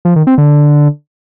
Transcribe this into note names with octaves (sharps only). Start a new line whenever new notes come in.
F3
D#3
C4
D3